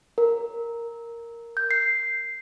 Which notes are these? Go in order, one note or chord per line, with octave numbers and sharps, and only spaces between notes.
A#4
G6
C7